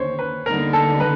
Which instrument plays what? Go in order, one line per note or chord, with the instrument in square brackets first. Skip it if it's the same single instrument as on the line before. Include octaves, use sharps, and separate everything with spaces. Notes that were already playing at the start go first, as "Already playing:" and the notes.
Already playing: [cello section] D#2 D3 [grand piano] C5 C#5
[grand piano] B4
[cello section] D#2 D3 G3 B3 D#4 [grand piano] A#4
[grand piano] A4
B4